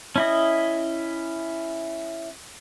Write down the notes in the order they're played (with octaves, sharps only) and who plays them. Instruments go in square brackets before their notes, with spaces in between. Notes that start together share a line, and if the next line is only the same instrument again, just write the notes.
[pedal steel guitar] C#4 E4 D#5